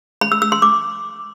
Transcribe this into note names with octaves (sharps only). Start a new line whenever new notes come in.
B5
E6
E6
C6
D6